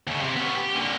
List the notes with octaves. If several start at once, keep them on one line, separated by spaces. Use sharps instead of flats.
D#2 C#3
C3
B3 C#4
G4
A#2 D3